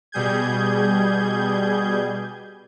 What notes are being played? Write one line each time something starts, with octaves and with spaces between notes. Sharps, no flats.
B2 G3 G#4 G6 G#6